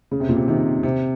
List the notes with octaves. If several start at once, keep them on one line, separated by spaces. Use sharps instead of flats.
C#3
C3
A#2
C3
C3 D#3
C3